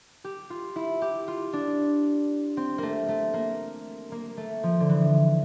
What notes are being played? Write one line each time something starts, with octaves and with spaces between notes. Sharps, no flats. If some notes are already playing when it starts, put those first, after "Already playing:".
G4
F4
E4
G4
F4
D4
C4
A3 A#3
A3
A#3
A#3
A3
F3
D3
E3